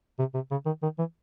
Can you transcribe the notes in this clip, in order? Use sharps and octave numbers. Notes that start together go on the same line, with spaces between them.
C3
C3
C#3
D#3
D#3
E3